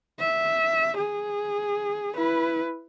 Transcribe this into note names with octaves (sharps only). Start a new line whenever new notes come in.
E5
G#4
E4 B4